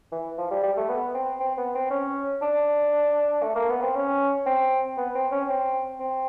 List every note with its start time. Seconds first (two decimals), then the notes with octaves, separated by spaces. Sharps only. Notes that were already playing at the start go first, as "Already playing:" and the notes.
0.12 E3
0.38 F3
0.51 G3
0.63 G3
0.77 A3
0.89 B3
1.15 C4
1.40 C4
1.58 B3
1.75 C4
1.91 C#4
2.42 D4
3.43 A3
3.56 A#3
3.69 B3
3.82 C4
3.95 C#4
4.46 C4
4.97 B3
5.15 C4
5.32 C#4
5.49 C4
6.00 C4